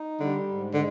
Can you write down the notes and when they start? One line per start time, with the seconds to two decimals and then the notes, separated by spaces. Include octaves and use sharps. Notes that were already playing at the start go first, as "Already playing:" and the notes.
Already playing: D#4
0.20 D3 G3
0.47 G#2
0.74 D3 G#3